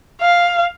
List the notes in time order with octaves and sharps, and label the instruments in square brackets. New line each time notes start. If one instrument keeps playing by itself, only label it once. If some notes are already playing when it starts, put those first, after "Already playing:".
[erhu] F5